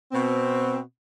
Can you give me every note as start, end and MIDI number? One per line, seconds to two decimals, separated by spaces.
0.12 0.78 47
0.12 0.78 60